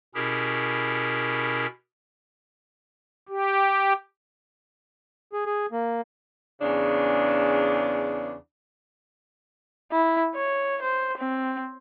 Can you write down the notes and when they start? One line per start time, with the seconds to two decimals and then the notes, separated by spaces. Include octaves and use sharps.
0.15 B2 C#4 E4 G4 G#4 A#4
3.29 G4
5.33 G#4
5.46 G#4
5.72 A#3
6.62 E2 C#3 D4
9.92 E4
10.35 C#5
10.82 C5
11.17 C4